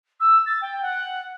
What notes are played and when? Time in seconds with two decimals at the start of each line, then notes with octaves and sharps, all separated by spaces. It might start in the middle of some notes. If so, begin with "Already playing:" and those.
0.20 E6
0.46 A6
0.61 G5
0.82 F#5